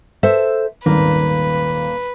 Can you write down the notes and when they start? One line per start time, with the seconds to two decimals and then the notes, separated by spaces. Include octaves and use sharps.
0.23 A4 C5 E5
0.86 D#1 G#1 A#3 B4